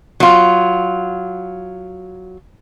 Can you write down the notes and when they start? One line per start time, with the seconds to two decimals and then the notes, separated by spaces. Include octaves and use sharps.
0.20 F#3 F4